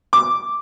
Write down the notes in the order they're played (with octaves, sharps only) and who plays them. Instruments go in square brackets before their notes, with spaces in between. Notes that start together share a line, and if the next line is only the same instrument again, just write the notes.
[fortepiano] D6